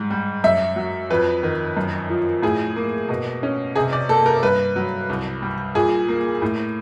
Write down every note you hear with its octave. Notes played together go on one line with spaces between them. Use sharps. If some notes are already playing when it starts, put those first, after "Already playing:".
Already playing: G#2 G3
G3
F#2 E5
F#3
F2 B4
D#3
F#2
F3
A2 G#4
A#3
B2
C#4
C3 G#4
D5
A#3 A4
A#4
G2 B4
F#3
C2
G3
A#2 G#4
A#3
A2